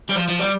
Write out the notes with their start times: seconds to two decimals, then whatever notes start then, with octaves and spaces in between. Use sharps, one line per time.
0.09 G3
0.16 F3
0.28 F3
0.40 G3